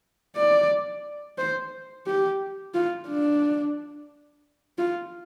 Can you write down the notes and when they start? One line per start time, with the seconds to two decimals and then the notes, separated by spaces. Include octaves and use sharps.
0.37 D5
1.38 C5
2.07 G4
2.74 F4
3.08 D4
4.78 F4